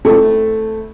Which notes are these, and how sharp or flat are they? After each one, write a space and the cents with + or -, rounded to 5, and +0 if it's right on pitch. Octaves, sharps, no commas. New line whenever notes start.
A3 +0 C4 +0 E4 -20